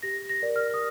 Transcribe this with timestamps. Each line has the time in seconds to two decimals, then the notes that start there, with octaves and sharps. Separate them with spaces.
0.02 G4 A#6
0.29 A#6
0.42 A#4 D5
0.56 F6
0.74 D#6